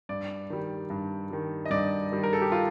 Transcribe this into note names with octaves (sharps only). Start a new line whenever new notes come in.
G2 D5
D#3 G3
G2
D#3 G3
D#5
G2 D5
D#3 G3
A#4
A4
G4
F4